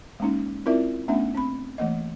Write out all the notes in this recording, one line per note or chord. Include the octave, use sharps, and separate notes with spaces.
G#3 A#3 C#4 D#4
C4 E4 F4 A#4 D5 E5
A3 B3 C#4 D4 E5
C4 B5
E3 A3 A#3 D#5